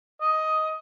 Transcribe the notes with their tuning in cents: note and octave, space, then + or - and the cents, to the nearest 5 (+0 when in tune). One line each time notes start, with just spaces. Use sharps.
D#5 +10